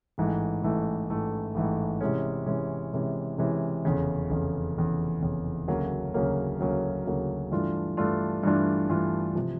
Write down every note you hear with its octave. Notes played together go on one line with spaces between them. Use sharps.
A1 G#2 E3 A3
A1 G#2 E3 A3
A1 G#2 E3 A3
A1 G#2 E3 A3
C3 E3 G#3 C#4
C3 E3 G#3 C#4
C3 E3 G#3 C#4
C3 E3 G#3 C#4
F1 E2 C#3
F1 E2 C#3
F1 E2 C#3
F1 E2 C#3
D2 C#3 F#3 A#3
D2 C#3 F#3 A#3
D2 C#3 F#3 A#3
D2 C#3 F#3 A#3
G2 E3 A3 D4 F4
G2 E3 A3 D4 F4
G2 E3 A3 D4 F4
G2 E3 A3 D4 F4
C3 F3